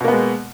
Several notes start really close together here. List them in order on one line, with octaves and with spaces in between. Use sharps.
B2 A#3 B3 G#3